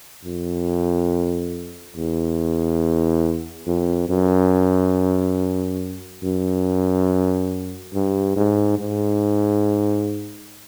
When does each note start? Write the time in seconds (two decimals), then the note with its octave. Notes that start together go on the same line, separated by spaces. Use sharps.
0.25 F2
1.96 E2
3.66 F2
4.09 F#2
6.23 F#2
7.94 G2
8.36 G#2
8.79 G#2